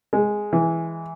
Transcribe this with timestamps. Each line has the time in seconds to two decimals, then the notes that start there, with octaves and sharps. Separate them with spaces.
0.13 G#3
0.53 E3